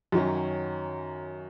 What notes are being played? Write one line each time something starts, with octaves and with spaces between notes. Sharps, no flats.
F#2 D#3 F#3 C#4